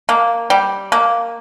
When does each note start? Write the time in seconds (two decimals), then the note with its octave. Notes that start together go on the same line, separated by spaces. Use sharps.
0.09 A#3
0.50 G3
0.92 A#3